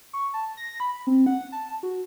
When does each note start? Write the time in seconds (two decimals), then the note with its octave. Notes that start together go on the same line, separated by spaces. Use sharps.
0.13 C#6
0.34 A5
0.57 A#6
0.80 B5
1.07 C4
1.26 F#5
1.52 A5
1.83 F#4